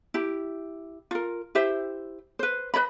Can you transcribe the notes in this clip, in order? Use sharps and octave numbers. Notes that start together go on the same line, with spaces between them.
E4 G4
F4 A#4
E4 G4 C5 E5
B4 C5
B4 C#5 D#5 B5